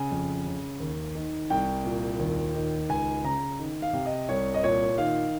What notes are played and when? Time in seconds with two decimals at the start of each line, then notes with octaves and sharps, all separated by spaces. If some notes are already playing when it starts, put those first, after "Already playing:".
Already playing: C#3 G#5
0.11 F2
0.45 C#3
0.80 D#2
1.15 D#3
1.50 C2 G5
1.85 A#2
2.19 D#2
2.55 D#3
2.89 C#2 G#5
3.24 C#3 A#5
3.59 D#3
3.82 F5
3.93 C3
4.06 D#5
4.29 C2 C#5
4.54 D#5
4.63 A#2 C#5
4.98 D#3 F5